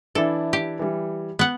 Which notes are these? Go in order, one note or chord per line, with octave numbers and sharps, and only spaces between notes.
E3 D4 E4 A4
G4
E3 G3
B3 F#5